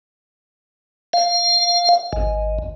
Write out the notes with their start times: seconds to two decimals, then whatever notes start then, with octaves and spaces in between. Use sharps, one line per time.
1.13 F5
2.13 G#1